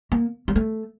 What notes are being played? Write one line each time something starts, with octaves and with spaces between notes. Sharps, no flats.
A#3
G3
A3